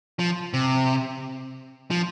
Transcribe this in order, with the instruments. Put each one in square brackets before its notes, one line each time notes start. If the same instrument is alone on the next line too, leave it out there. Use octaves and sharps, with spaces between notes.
[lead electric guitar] F3
C3
F3